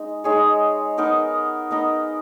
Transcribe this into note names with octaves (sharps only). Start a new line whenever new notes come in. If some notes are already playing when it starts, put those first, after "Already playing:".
Already playing: G#3 D#4
G#3 D#4 G#4 C#5
B3 D#4 A#4 D#5
B3 D#4 A#4 D#5